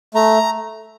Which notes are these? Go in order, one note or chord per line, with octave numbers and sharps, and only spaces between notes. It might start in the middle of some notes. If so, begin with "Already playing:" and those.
A3 A#5